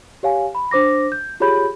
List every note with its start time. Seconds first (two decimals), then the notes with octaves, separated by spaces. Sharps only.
0.23 G4 C#5 F5 G#5
0.55 B5
0.71 D4 C5 D6 A#6
1.12 G6
1.40 F4 G4 G#4 C#5 B5 G6